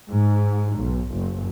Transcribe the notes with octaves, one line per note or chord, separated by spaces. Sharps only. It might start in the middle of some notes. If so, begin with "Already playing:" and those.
G#2
B1
F#1